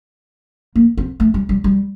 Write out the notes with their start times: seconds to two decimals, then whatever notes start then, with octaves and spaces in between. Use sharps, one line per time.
0.75 A#3
0.97 C4
1.20 A3
1.34 G3
1.49 G3
1.64 G3